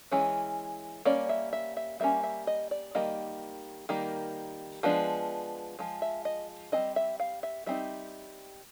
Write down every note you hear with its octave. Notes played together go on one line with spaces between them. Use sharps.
E3 G#3 C#4
G3 A#3 C#4 D5
E5
E5
E5
G3 A#3 C#4 E5
E5
D#5
D5
D#3 G3 A#3 D#5
D#3 G3 A#3
F3 G#3 B3 D4
F3 G#3
E5
D#5
G3 C4 D#4 D#5
E5
F5
E5
G3 C4 D#4 E5